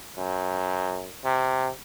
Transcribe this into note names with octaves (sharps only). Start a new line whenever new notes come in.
F#2
C3